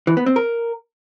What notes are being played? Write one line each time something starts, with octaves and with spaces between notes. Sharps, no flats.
E3
B3
C4
A#4